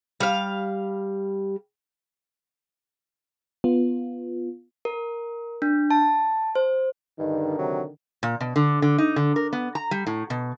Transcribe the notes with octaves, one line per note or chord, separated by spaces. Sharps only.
G3 F5
B3 F4
A#4
D4
A5
C5
G2 D3 D#3 D#4
C3 F#3
A#2
B2
D3
D3
D#4
D3
A#4
B3
A#5
G3
A2
B2